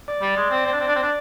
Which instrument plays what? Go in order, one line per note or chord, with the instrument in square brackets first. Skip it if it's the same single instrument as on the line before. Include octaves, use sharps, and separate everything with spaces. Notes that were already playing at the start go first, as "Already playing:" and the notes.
[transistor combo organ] D5
[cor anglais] G3
G#3
C4
C4
D4
C4
D4
C4
D4